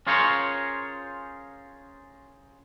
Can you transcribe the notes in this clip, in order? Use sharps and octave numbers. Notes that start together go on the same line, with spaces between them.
C#4 F4 G#4 A#4 C5 C#5